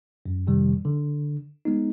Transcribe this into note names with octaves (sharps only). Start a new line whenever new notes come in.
F#2
F2 A2 C3 D#3 G3
D3
G#3 B3 D#4